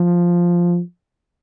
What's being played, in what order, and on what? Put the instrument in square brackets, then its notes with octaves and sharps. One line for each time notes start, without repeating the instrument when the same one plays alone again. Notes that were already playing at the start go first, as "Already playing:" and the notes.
Already playing: [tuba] F3